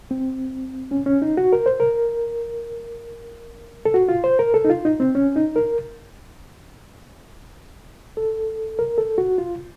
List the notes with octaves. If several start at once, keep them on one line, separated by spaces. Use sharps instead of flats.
C4
C#4
C#4
D#4
F#4
A#4
C5
A#4
A4
F#4
F4
C5
A#4
A4
D#4
F4
D#4
C4
C#4
D#4
A#4
A4
A#4
A4
F#4
F4